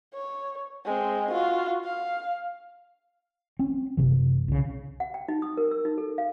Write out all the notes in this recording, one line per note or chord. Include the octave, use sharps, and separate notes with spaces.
C#5
G#3 C4
F4 F#4
F5
C4 C#4
F#1 C3 E3
C2 C#3
F#5
G5
D#4
D#6
A#4
E6
D#4
A4
F5